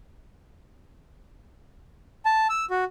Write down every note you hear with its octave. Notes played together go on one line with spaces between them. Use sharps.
A5
E6
F#4